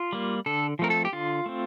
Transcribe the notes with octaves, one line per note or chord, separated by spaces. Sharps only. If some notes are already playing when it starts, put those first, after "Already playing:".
Already playing: F4
G3 A#3
D3 A4
F3 A3 C4 A#4
A4
G4
D3 F4
A3 C4